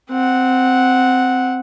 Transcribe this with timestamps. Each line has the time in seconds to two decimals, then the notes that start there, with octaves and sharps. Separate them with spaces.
0.10 C4 F#5